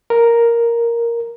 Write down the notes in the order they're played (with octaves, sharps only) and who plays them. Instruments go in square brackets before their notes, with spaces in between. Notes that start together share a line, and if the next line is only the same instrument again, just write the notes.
[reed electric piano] A#4